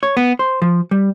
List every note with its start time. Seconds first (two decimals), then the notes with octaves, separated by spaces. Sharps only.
0.03 C#5
0.17 B3
0.39 C5
0.62 F3
0.91 G3